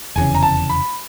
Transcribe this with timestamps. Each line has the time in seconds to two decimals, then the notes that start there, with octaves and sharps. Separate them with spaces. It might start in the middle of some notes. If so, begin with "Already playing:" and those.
0.16 F1 E2 C#3 G#5
0.35 A#5
0.43 A5
0.69 B5